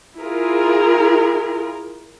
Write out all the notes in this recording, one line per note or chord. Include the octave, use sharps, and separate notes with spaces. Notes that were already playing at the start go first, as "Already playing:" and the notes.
E4 F4 G#4 A#4